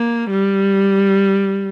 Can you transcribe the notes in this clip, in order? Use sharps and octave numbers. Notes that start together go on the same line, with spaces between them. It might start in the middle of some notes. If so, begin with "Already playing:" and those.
Already playing: A#3
G3